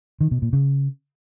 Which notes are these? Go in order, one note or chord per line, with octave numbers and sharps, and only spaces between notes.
D#3
B2
A#2
C#3